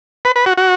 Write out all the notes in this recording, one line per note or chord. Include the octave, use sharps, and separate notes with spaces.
B4
B4
F#4
F#4